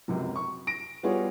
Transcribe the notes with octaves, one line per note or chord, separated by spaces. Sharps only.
C#2 F#2 C3 F#3
C#6
A#6 D7
G3 B3 F4 F#4 G#4 C#5